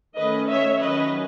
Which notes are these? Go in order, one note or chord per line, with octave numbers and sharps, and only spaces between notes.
D#3 A3 C#4 B4 D#5
C#5 E5
D#3 F#3 C#4 B4 D#5